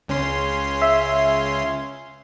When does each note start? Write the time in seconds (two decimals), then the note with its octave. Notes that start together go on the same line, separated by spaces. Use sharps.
0.08 C#2 C#4 C6
0.82 E5